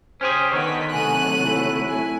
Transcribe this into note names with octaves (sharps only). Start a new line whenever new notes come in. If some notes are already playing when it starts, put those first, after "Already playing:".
C#4 G4 G#4 C5
D3 D#3 B3 D#5 C#6 B6
C3 F#3 A3 G#5 F#6 D#7
E4
G#5